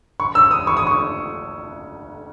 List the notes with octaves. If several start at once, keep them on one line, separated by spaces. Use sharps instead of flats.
C#6
E6
D#6
C#6
D#6
C#6